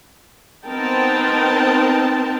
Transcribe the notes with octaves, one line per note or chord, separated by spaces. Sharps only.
B3 C4 D#4 A#4 G5 A5